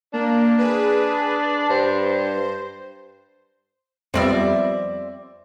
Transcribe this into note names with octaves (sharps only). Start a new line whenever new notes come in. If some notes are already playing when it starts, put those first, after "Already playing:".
A#3 D4
G#4 B4
G2 C5
F2 G3 B3 C4 D5 E5